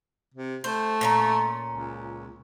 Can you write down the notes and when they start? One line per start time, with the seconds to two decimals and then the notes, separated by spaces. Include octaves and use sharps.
0.34 C3
0.64 A3 C5
1.01 A#2 C#4 A#5
1.69 C#2